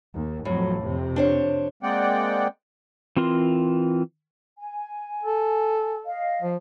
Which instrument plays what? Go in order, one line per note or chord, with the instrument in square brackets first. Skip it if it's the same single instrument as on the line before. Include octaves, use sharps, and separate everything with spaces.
[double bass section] D#2
[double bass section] F2 F#3 [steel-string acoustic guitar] A2
[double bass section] F2 C3
[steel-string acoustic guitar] D4 C5 C#5
[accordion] G#3 A#3 C4 D5 F#5 G5
[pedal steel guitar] E3 C4 F4 A#4 C6
[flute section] G#5
[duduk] A4
[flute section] D#5 F5
[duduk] F3